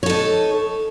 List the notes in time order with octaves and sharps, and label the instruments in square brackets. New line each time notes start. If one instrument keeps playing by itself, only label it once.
[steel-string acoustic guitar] C#5
A4
D#4